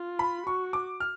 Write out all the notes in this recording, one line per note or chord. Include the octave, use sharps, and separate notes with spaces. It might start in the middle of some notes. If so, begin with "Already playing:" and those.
Already playing: F4
B5
F#4 C#6
D6
F6